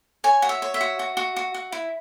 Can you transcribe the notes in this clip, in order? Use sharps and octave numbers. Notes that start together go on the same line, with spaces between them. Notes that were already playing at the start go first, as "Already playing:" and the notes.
C#5 G#5
F#4
E5
C#5
E5
F#4
F#4
F#4
F#4
F#4
E4